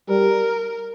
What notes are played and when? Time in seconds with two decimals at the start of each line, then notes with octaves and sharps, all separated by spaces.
0.09 G3 A#4